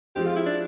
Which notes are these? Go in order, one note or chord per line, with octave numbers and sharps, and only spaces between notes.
F3 G#3 C4 G4
F4
E4
D4